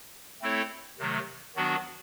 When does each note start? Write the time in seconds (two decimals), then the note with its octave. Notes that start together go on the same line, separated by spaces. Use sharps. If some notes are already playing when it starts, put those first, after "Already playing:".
0.42 A3 C4 E4 A4 C#5
0.99 C3 D#3 F#3 A3
1.56 D#3 F#3 B3 D4 F#4